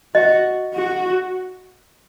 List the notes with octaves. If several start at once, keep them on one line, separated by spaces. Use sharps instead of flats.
F#4 D#5
F#4